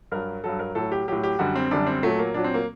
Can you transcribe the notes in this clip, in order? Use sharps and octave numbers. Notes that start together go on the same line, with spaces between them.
G2 F#3 A#4
G2 F#3 A4
A#4
A2 F#3 A4
G4
A2 F#3 G4
G4
F#2 D3 G3 F#4
C4
F#2 D3 G3 D4
C4
A#2 F#3 A3
A#3
A#2 F#3 D4
C4
A#3